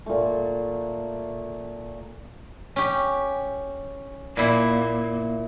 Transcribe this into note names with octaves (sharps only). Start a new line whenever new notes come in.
A#2 A3
C#4 G4
A#2 A#3 E4